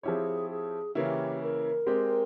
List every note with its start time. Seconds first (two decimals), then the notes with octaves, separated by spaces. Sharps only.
0.03 F3 C4 E4 G4 G#4 C#5
0.49 G#4
0.95 C#3 E3 A#3 C#4 E4 G4
1.41 A#4
1.87 G#3 C4 G4